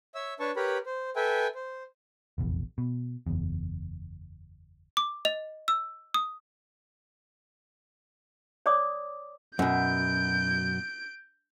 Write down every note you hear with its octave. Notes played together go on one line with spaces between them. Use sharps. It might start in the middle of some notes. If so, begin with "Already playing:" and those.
C#5 E5 E6
D4 B4 C#5 A5 C#6
G4 A#4 B4 C#5 B5
C5
A4 B4 E5 G5 G#5
C5
F1 A#1 E2
B2
F#1 E2
D6
D#5 F7
E6
D#6
C#5 D5 D6 D#6
F#2 B2 G6 D7